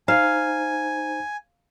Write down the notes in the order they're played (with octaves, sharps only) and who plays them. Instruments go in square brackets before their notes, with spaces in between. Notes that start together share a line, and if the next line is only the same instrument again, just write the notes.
[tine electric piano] D#4 C5 A#5 [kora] F5 [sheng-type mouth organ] G#5